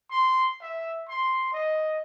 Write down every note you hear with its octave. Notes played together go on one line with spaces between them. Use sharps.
C6
E5
C6
D#5